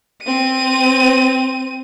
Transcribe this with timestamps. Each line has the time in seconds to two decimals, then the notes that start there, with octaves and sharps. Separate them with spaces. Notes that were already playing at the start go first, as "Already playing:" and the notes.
0.23 C4 D#7